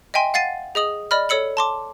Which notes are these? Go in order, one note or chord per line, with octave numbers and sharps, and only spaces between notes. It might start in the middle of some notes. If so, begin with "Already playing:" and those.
D#5 E5 G5 G#5 C6
F5 F#5 A6 C7 D#7
G#4 D#5 D#6 F#7
D5 D#5 B5 F6
A4 C#5 E6 C#7 F#7
A5 C6 D6